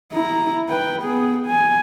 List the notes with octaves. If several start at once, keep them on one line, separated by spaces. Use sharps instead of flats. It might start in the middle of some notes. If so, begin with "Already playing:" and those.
E4 A#5
B4 G5
B3 G#4
G#5